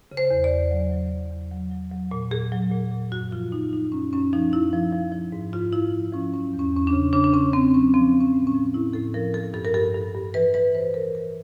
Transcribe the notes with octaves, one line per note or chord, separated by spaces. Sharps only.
C#3
C5
E2
D5
E2
F#3
F#3
E2
E2
F#3
F#3
F#3
A#2
A#2 G#4
F#3
A#2
A#2
F#2 F#4
F3 F4
F#2 D#4
F#2 D#4
F#2 C#4
F#2 C#4
F3 D#4
F#2 E4
F3
F3
F3
G#2
G#2 F4
F3 E4
F3
F3 C#4
F#3 C#4
E2
C#4
E2 C#4
D4
C#3
C#3 D4
D4
C#3 C#4
C#3 C4
F#3 C#4
F3 C4
F3
C#4
A2
C#4
F3
A2 E4
A2 A4
F3 A#4
F3 A4
G2 A4
A#4
G2 A4
G2
G2
E3 B4
E3 B4
G2 C5
G2 A#4
G2 A#4